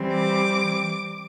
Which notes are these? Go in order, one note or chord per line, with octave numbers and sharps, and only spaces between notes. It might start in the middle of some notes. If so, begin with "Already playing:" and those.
Already playing: E3 G3 C4
D6